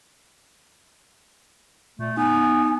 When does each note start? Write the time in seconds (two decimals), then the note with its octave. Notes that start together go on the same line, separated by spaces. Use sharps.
1.99 A#2 A3
2.17 B3 D#4 G#5